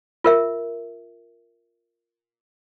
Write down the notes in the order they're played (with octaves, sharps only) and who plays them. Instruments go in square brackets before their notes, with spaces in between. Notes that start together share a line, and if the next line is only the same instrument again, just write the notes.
[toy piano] F4 A#4 E5